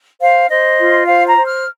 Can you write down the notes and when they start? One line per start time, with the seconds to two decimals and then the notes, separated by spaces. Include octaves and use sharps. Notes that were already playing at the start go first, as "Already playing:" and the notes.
0.21 C5 F5
0.50 C5 D#5
0.79 F4
1.08 C5 F5
1.27 A#5
1.37 C5
1.47 F6